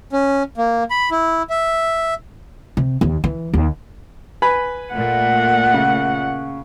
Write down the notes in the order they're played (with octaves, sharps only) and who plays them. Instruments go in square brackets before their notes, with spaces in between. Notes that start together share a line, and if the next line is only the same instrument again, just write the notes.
[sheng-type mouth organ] C#4
A#3
B5
E4
E5
[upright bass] C3
D#2
E3
D#2
[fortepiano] B4 G#5 B5
[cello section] A#2 A3 [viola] F#5
[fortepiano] C#3